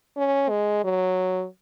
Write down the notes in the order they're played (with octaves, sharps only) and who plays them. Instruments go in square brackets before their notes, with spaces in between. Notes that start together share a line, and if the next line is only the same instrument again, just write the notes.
[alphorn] C#4
G#3
F#3